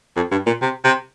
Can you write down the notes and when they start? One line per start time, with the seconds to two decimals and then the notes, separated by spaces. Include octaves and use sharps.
0.16 F2
0.31 G2
0.46 A#2
0.62 C3
0.85 C3